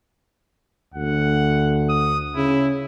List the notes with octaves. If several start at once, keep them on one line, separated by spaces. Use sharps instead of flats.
D2 F#5
D#6
C#3 E4